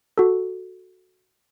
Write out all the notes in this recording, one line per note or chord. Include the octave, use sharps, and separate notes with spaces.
F#4 A4